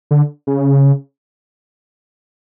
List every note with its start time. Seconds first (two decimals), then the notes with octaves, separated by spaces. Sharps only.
0.11 D3
0.47 C#3